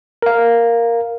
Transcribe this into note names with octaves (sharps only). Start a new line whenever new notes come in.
A#4 F5